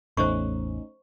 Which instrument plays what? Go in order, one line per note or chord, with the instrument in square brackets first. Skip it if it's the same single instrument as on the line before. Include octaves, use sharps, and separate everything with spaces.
[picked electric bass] A1 E2 [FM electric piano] A3 C#4 D#4 [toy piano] C5 C#6